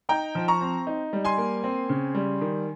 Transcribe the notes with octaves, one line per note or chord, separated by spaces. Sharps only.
D#4 G5 A#5
F3
A#5 C#6
C4
D#4
G3
G#5 C6
A#3
C4
C#3
G3
D#3